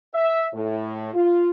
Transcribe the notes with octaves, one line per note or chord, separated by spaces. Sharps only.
E5
A2
F4